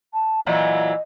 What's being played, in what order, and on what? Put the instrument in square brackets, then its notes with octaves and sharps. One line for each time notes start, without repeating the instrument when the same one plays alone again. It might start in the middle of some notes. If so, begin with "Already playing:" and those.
[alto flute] A5
[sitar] A#2 E3 F#3 [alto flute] D#5